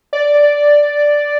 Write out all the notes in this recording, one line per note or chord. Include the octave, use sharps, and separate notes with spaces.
D5